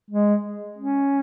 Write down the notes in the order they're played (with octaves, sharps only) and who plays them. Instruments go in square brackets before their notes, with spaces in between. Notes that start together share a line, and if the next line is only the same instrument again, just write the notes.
[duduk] G#3
C#4